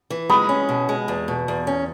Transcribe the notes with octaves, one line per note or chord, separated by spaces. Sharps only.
E3
G#3 B5 D#6
C#4
B2
G#3
E2
B2
E2
C#4